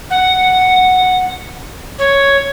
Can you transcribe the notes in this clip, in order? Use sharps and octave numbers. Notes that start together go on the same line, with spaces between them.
F#5
C#5